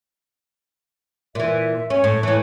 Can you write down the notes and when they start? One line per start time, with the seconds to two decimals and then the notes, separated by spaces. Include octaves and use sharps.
1.35 A#2 E3 E5
1.90 C#4 C#5
2.04 A2
2.23 A2 E3